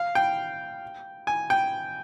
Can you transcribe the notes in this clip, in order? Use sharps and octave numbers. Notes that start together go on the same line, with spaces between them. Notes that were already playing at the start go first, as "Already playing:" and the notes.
Already playing: F5
G5
G#5
G5